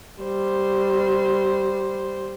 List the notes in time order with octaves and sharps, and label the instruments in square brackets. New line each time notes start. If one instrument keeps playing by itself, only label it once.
[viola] G3 C5